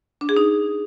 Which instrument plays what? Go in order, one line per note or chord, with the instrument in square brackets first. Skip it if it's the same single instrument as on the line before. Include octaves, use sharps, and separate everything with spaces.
[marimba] D4
G#4
D#4